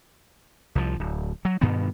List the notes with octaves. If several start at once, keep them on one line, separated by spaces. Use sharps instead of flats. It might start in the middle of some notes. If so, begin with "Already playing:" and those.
C2 F3
D1
F#3
G2 B2 D#3 B3